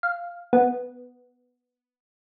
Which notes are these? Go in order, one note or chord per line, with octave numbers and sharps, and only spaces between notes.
F5
B3